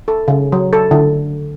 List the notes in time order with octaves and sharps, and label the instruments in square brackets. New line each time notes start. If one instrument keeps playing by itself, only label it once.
[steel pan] A4
C#3
F#3
A4
D3